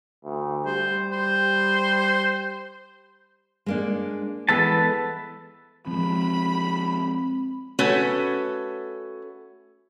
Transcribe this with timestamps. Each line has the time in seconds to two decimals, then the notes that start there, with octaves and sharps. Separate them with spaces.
0.25 D2
0.65 G3 C5
1.12 C5
3.66 G#3 A#3 D4
4.49 E3 G#3 B3 A4 B4 A5
5.87 F3 G#3 C4 B5
7.79 A3 C#4 F#4 A4 B4